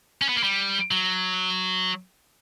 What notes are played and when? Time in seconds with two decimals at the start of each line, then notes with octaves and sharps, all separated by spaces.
0.22 C#4
0.29 B3
0.36 A#3
0.44 G3
0.91 F#3